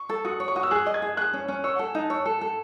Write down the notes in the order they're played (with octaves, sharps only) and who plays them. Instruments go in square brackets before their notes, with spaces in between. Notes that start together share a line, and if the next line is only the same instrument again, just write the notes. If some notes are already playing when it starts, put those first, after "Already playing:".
Already playing: [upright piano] C#6
[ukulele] A4
[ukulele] F#4 [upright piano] D#6
[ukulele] C#5
[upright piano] C#6
[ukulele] F#4 [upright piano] D#6
[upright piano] E6
[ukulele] G#4 [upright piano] F#6
[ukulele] D#5
[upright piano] G#6
[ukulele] G#4
[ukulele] G#4 [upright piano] F#6
[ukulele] C#4
C#4
[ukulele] C#5 [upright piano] E6
[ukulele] A4 [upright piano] F#5
[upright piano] G#5
[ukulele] D#4 [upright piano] A5
[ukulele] C#5 [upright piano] E6
[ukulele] A4
A4